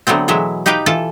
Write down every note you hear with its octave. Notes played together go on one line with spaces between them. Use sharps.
D3 F#3 A3 B3 C4
B2 E3 F#3 G#3 E5
D#4 G4 B4 D#5 F5 G5
E3 F4 A4 A5